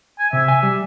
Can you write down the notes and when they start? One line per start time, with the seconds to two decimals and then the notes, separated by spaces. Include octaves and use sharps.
0.19 G#5
0.33 C3 E5
0.48 G#5
0.63 G3